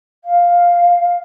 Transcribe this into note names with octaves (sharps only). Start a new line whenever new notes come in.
F5